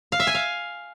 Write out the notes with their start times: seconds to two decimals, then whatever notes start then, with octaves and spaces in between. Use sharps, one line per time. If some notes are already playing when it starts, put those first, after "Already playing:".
0.12 F5
0.20 E5
0.27 G#5
0.34 F5